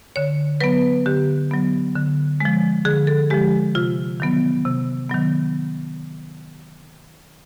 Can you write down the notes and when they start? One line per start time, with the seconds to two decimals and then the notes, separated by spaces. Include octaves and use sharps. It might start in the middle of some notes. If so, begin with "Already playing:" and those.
0.16 D3 C#5
0.61 F#3 B3 B4
1.06 D3 G4
1.51 F#3 B3
1.95 D3
2.40 F3 G#3
2.85 D3 G#4
3.07 A4
3.30 F3 G#3 G4
3.75 C3 F4
4.20 D#3 F#3 B3
4.65 C3
5.09 D#3 F#3 B3